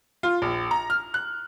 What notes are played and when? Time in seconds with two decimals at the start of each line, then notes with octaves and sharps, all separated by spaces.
0.23 F4
0.42 A#1
0.71 A#5
0.90 F6
1.14 F#6